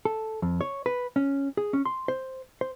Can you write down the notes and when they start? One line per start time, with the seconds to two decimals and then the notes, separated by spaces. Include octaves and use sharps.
0.05 A4
0.42 F2
0.61 C#5
0.86 B4
1.16 C#4
1.57 G#4
1.73 C#4
1.85 C6
2.08 C5
2.61 C5